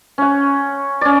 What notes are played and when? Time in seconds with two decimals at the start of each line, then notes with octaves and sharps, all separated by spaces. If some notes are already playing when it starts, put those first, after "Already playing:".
0.18 C#4 F#5
1.01 C#4 D5